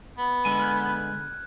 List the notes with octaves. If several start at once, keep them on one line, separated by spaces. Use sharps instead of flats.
B3
D3 G#3 G#5
F6 F#6 G#6